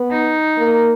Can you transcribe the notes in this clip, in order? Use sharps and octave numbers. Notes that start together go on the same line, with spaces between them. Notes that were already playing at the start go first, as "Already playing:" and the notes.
Already playing: B3
D#4
A#3